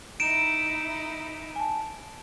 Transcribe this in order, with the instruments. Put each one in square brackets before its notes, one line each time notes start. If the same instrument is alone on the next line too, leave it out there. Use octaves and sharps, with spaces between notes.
[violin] D#4 E4 [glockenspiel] D7 E7
[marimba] G#5 A5